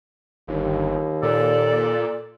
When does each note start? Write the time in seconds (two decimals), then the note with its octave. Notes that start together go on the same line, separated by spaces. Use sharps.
0.48 G1 D#2
1.23 A#2 A4 D5